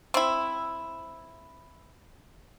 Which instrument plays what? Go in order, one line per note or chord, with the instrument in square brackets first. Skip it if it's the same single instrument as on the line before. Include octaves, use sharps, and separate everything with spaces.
[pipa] C4 E4